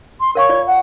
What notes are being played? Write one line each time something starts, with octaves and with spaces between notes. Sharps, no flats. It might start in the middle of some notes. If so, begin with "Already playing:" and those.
C6
A#4 C#5 F5 C#6
F4 D5
F#5